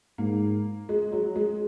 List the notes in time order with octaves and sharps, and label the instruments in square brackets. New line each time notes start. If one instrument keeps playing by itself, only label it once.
[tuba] G#2 [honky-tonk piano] A#3
[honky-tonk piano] G#3
F#3
G#3